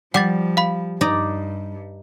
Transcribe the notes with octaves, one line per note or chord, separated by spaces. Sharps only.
F3 G3 F#5 D6 A6
F5 B5
G2 D#4 D5 A#5